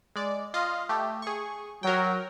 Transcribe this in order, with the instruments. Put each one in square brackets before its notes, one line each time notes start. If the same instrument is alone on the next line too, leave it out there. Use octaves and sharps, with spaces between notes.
[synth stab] G#3 D5
F4 D#5 F5
A3 G4
G#4 C#6
[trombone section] F#3 [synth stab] A#4 G5